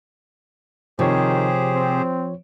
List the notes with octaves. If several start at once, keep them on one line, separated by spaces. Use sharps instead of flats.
C3 D#3 F3 G4 G#4 C5 C#5
C4